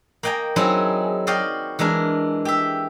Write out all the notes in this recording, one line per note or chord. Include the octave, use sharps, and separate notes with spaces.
A#3 D#5 G5 G#5 A#5
F#3 C4 D#4 E4 G#4
F#4 D5 D#5 F5 G5
E3 G#3 D4 A#4
G4 E5